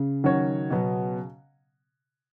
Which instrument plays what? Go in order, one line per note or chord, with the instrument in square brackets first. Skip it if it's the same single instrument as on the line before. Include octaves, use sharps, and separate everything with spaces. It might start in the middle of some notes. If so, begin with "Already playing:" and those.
Already playing: [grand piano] C#3
[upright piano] D#3 F#3 C#4 F#4 C#5
B2 F#3 B3